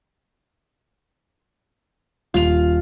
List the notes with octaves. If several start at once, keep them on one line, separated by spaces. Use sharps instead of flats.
D#1 F4 F7